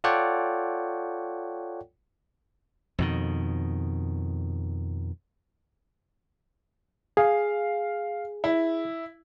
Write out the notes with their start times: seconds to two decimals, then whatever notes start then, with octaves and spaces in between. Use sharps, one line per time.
0.04 F4 A4 C#5 D5 F#5 G5
2.98 F2 B2 D#3
7.17 G#4 F5
8.44 E4